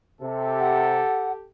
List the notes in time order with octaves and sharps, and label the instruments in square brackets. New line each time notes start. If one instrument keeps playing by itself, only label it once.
[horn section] C3 [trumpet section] G4 A4
[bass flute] F#5